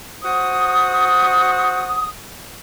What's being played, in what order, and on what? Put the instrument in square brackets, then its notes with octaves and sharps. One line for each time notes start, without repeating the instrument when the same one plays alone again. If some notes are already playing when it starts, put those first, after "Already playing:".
[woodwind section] F#4 C5 D#6